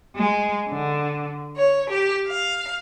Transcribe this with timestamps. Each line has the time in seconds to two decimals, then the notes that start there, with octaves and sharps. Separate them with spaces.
0.15 G#3
0.68 D3
1.56 C#5
1.90 G4
2.27 F5